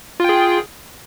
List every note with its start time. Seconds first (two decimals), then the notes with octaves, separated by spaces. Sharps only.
0.20 F4
0.24 G5
0.29 G#4